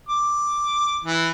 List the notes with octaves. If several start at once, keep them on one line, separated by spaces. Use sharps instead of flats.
D6
E3